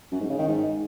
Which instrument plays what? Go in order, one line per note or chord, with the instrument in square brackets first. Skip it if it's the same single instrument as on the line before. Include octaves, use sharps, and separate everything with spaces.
[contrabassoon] F#2
G#2
C#3
D#3
G#2